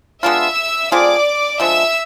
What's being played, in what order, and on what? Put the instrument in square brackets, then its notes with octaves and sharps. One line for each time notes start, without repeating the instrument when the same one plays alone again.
[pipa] G#3 B3 D4 F4 [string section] E5 E6
[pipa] A3 C4 F4 G#4 [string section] D5 D6
[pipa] D3 F3 G#3 [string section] E5 E6